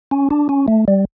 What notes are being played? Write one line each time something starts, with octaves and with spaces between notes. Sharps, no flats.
C#4
D4
C#4
A3
G3